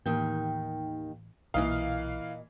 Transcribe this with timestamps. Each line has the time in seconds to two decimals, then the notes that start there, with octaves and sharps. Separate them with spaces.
0.06 D#2 A2 D#3 E3 G5
1.54 B1 A#2 E3 D#5 F5